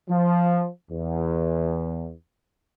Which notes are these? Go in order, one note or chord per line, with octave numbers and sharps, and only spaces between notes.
F3
E2